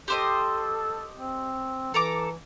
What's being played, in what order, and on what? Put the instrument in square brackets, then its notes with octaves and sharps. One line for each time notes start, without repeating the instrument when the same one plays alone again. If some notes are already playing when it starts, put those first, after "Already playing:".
[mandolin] G4 C5 D#5 [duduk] A4
[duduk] C4
[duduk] E3 [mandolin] A4 A#5 D6